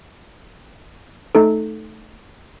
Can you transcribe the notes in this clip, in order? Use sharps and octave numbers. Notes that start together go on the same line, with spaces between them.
A3 D#4 A4